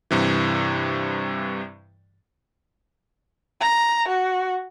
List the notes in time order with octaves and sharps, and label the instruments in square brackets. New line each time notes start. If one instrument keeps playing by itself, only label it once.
[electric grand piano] G2 C3 E3
[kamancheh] A#5
F#4